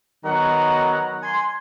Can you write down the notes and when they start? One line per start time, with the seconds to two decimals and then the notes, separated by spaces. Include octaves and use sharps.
0.25 D#3 F#3 B3 F#5 A#5
1.23 G#5 C6